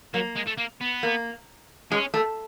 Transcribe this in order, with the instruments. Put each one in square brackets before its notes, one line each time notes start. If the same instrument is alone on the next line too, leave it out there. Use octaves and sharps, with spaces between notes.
[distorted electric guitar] F#3 [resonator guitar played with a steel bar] A#3
[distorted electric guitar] G#3
A3
A#3
B3
[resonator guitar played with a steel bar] A#3
[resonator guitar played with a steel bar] G#3 [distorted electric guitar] C#4
[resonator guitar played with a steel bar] A3